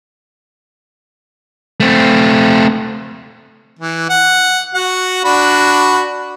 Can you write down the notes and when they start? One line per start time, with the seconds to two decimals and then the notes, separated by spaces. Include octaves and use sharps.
1.80 A3 C4
3.79 E3
4.09 F#5
4.74 F#4 F#5
5.24 D4 F#4 B5